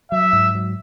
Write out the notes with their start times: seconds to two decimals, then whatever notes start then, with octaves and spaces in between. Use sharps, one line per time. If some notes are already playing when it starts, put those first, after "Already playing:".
0.11 F#3 E5
0.33 G#2
0.55 F#3